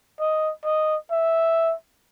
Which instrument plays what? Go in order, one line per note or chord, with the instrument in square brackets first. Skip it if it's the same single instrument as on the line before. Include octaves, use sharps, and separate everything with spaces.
[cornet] D#5
D#5
E5